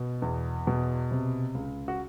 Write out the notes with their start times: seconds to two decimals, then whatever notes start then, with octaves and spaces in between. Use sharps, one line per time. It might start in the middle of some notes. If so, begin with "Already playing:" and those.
Already playing: B2
0.22 E2
0.67 B2
1.11 C3
1.54 C#2
1.88 F#4